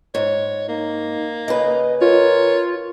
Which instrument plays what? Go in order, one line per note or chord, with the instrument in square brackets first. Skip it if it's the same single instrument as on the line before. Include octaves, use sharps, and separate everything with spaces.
[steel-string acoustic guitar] G#2 [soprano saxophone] C#5
[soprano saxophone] A#3 [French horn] D#4
[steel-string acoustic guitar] C#3 B4 [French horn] D#5
[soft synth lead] F4 [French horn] A#4 [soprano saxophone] C#5